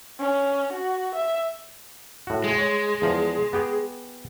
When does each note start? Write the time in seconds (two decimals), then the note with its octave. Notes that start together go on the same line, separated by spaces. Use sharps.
0.20 C#4
0.73 F#4
1.15 E5
2.27 A2 F#4
2.44 G#3
2.58 C#5
3.02 E2 F3
3.53 B3 G4 G#4